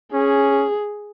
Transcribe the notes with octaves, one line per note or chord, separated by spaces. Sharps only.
C#4 G#4